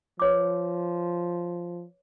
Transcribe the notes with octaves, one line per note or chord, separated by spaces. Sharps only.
F3 B4 C#5 D6